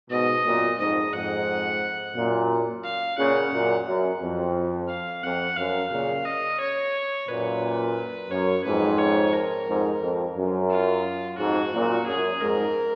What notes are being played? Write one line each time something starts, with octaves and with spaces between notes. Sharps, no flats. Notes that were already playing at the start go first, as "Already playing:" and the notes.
G#2 B2 D#5
F#2 A#2
F2 G#2 D#5
F2 G#2 F#5
F#2 A#2
F5
A#2 C#3 F#5
F#2 A#2
F#2
F2
F5
F2 F#5
F#2 F5
A#2 C#3
D#5
C#5
F#2 A#2 B4
F#2 C#5
F2 G#2 B4
C#5
A#4
F2 G#2
F2
F#2
F4
F2 G#2 F#4
F#2 A#2
F#2 G#4
F2 G#2 A#4